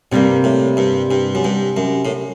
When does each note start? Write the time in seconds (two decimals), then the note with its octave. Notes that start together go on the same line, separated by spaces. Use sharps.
0.12 G2 C3 G3 A#3
0.44 A2
0.77 G2
1.11 G2
1.35 F#2
1.44 G2
1.77 F#2
2.05 A2